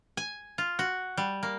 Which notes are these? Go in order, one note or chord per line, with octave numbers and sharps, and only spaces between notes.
G#5
F4
F#4
G3
A#3